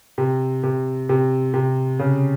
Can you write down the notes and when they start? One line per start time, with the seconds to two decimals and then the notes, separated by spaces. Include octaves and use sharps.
0.18 C3
0.63 C3
1.09 C3
1.54 C3
1.99 C#3